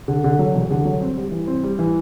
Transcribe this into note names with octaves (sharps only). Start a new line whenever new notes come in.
D3
D3
F#3
E1
D3
F#3
C4
G3
E3
C4
G3
E3